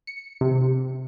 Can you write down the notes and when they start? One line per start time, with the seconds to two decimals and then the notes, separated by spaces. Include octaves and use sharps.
0.07 C#7
0.41 C3